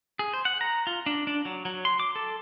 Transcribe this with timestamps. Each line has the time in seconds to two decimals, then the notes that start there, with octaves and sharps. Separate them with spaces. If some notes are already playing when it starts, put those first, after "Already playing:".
0.19 G#4
0.33 C5
0.45 F#5
0.61 A#5
0.87 F4
1.06 D4
1.27 D4
1.45 F#3
1.65 F#3
1.85 C6
2.00 D6
2.16 A4